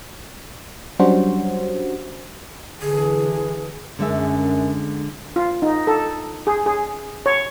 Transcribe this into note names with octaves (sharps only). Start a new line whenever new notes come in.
F#3 G3 C#4 D4 F#4 C5
D3 E3 G#4
F#2 D3 G#3 E5
F4
D#4
A4
G#4
G#4
C#5